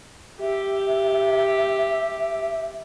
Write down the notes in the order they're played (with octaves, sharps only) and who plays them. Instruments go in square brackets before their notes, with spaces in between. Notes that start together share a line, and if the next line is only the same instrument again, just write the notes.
[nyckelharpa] G4 [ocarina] E5